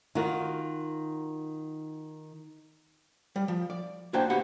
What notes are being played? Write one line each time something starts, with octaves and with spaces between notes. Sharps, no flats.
D#3 F4 F#4
G3
F3
D5
A#3 D4 F#4 C5 G5
B2 G4 F#5 B5